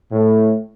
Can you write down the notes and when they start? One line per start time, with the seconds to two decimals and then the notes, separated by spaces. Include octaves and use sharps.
0.12 A2